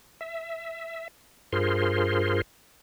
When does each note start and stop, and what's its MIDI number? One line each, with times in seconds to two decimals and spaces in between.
0.21 1.08 76
1.53 2.41 43
1.53 2.41 65
1.53 2.41 68
1.53 2.41 70
1.53 2.41 72
1.53 2.41 84